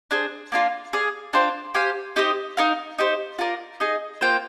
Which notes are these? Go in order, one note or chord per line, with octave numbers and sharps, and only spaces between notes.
D4 G#4 C5
A#3 D4 F4
G#4 D5 F5
D4 F4 C5 G5
G4 C5 F5 G#5
D#4 G4 C5 D#5
D#4 A#4 F5
D#4 G4 C5
F4 A#4 D5
D#4 G#4 D#5
A#3 F4 C5 G5